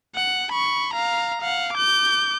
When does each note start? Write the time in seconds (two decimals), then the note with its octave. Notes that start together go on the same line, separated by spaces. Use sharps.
0.15 F#5
0.52 B5 C#6
0.93 F5 A#5
1.41 F5 F#5
1.73 D6 G6